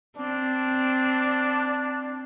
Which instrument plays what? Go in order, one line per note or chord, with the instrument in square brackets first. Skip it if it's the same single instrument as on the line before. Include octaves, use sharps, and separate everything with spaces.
[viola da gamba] C4 [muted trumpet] D4